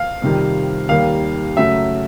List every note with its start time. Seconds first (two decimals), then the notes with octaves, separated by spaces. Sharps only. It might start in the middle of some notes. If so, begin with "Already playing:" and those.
Already playing: F5
0.22 F2 C3 D#3 G3
0.89 D#2 D#3 G3 A#3 F5
1.57 F#2 C#3 F#3 A3 E5